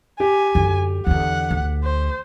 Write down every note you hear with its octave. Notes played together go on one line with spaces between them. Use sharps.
G4 G#5
F#2 D3
E2 D3 F#5
D2
C5